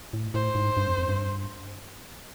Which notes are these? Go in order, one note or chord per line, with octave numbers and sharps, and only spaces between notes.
A2
A2 C5
G#2
G2
F2
F2
G2